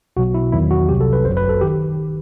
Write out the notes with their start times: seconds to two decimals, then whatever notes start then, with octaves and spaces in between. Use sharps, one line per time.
0.17 B1 B2 F#3 F#4
0.34 E4
0.52 E2 D#3 F#3 E4
0.71 F#4
0.88 C2 C3 F#3 G4
1.01 A4
1.13 B4
1.25 G1 F#2 F#3 C5
1.37 B4
1.49 A4
1.61 D#3 G4